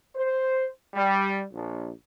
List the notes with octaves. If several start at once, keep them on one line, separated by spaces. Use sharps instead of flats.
C5
G3
A#1